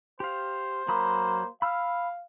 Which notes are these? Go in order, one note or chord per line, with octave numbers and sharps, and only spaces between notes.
G4 C5 F5
F#3 A#3 B5 D#6
F5 B5 E6 F6